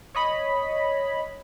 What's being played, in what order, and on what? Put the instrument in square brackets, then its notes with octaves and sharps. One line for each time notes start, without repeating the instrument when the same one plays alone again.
[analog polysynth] C#5 D#5 B5